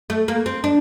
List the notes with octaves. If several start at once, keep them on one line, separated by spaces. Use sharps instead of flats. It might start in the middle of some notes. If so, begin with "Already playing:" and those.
A3
A#3
C4
D4